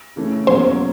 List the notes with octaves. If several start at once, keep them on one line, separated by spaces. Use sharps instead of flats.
C#3 E3 A3 C#4
E2 B2 F#3 A#3 C#4 C5